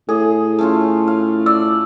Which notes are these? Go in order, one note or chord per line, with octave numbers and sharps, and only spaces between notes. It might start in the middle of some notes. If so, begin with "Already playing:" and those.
A2 G#4 A4
A3 C#4 F4
F5
D5 E6